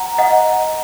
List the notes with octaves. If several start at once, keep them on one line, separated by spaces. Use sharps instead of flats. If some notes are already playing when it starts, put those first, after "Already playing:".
Already playing: F#5 A#5
D#5 F#5